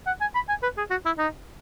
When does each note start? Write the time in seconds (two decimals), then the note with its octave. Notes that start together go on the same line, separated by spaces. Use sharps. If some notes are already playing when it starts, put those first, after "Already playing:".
0.07 F#5
0.21 G#5
0.35 B5
0.48 G#5
0.63 B4
0.77 G#4
0.90 F#4
1.05 E4
1.18 D#4